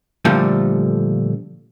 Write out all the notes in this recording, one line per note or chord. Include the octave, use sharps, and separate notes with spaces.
A#2 D3 F3 G3 A3